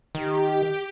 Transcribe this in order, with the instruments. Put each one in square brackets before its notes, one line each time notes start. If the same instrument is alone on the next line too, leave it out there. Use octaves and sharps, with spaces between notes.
[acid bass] D#3 [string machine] G4